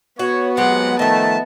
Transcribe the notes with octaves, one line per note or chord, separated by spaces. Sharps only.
B3 F#4 C#5
F#3 G#3 C4 G4 F#5
D#3 F3 A3 D#5 E5 A5